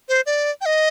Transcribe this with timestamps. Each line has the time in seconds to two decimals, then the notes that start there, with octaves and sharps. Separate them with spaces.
0.09 C5
0.26 D5
0.61 G5
0.66 D#5